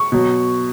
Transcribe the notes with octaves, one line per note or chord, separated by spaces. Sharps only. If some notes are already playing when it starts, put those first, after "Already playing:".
Already playing: C#6
B2 F#3